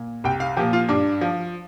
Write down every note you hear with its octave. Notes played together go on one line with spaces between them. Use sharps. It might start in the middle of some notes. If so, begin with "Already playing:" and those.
Already playing: A#2
C2 G5
F5
A#2 F3 G4
F4
G2 D4
F3